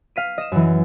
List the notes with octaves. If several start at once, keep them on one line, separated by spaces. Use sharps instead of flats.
F5 B6 D#7
D#5 E7
F#2 E3